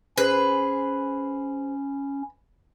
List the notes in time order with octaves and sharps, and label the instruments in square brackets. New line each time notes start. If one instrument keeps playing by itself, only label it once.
[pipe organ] C#4 [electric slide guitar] G#4 C5 [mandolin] B4